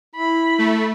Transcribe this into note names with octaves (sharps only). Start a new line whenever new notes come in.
E4 B5
A3